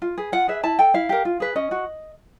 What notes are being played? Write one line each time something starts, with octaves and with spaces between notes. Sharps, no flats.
F4
G#4 B4
F4 F#5
G#4 B4 E5
E4 A5
A4 G5
E4 F5
G4 A#4
F4
G#4 B4
C#4 D#5
F#4